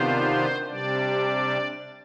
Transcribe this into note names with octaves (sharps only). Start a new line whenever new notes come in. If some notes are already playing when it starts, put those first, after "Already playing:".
Already playing: C3 D#3 B3 D4 F4 C5
C3 G3 D4 D5